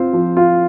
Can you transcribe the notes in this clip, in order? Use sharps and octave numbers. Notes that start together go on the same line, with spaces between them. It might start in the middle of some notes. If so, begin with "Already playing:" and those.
Already playing: C4 F4 C5
F3
F4